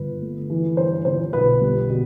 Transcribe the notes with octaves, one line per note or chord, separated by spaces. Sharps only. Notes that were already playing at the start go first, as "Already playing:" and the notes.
Already playing: G1 G2 B4
A3
E3
G2 C5
G1 C5
B1 B4
G3
B2